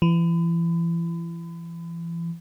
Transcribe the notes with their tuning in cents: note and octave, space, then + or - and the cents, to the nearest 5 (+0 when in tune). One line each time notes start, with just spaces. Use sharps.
E3 +35